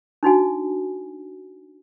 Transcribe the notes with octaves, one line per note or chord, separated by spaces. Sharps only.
D4 D#4 F#4 G#5